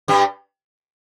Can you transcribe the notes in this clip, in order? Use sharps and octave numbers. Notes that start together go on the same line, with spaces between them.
G2 G3